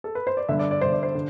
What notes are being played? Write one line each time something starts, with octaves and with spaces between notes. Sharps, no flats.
A4
B4
C5
D5
G2 D3 E5
D5
D5
G2 D3 C5
D5
C5
D3